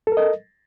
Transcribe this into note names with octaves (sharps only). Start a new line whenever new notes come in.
A4 A#4 D#5